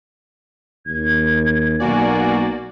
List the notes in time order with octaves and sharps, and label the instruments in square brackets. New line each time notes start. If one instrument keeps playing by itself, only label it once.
[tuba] D#2 [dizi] G#6
[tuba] B1 [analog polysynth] A#3 F#4 D5 [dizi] G#5